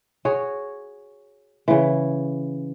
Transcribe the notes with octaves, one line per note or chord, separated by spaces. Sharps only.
F#4 G#4 C#5
C#3 E3